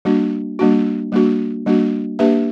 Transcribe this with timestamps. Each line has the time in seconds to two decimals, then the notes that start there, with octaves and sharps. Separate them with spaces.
0.05 G3 A#3 D4 F#4
0.59 G3 A#3 D4 F#4
1.12 G3 A#3 D4 F#4
1.66 G3 A#3 D4 F#4
2.19 A#3 D4 G4 B4 E5